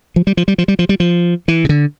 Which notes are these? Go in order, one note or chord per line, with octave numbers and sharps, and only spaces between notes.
F3
G3
F3
G3
F3
G3
F3
G3
F3
E3
C#3
D3